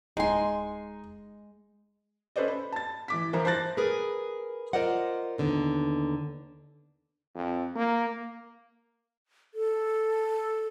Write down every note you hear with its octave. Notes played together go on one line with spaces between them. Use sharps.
D1 G#3 D#4 G#5 C6
C#4 A4 B4 C5 D5 D#5
B5
A5 A6
E3 D6 B6
E3 F3 E4 A#4 C5
C5 A5 F#6 A6 A#6
G#4 A#4 B4
F4 A#4 C5 D5 D#5 F#5
D#2 D3 B3 D#4
F2
A#3
A4